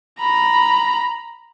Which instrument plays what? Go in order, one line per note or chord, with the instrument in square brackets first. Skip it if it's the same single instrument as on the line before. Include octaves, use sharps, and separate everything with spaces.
[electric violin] A#5 B5